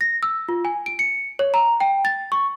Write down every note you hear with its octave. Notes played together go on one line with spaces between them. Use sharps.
A#6
E6
F4
G#5
D7
C#7
C#5
A#5
G5
A6
C#6